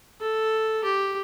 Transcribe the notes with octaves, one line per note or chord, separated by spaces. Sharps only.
A4
G4